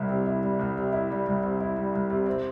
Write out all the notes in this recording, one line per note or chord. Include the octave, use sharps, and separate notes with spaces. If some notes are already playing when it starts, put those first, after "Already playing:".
Already playing: C2 G3 E4
C3
E4
G3
C2
C3
E4
G3
C2
C3
E4
G3
C2
C3
C4